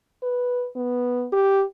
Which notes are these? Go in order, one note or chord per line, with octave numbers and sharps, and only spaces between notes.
B4
B3
G4